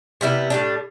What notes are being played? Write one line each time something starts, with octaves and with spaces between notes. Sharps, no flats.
C3 G3 B3 E4
A2 G3 D4